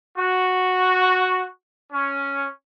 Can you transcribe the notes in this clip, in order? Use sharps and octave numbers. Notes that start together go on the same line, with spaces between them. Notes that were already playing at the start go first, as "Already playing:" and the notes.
F#4
C#4